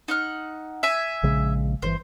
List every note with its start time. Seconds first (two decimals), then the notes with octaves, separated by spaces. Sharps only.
0.08 D#4 F#5 F6
0.83 E5 G#5
1.23 A#1 C#3 G#3
1.82 G1 D3 E3 C5